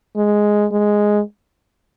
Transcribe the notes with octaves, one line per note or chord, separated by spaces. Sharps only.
G#3
G#3